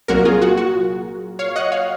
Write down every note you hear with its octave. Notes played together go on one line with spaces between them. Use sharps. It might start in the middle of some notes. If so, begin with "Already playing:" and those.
C2 A#2 F#3 A#3 F#4 A#4
F4 G#4
F#4
F#4
C#5 F5
D#5 F#5
C#5 F5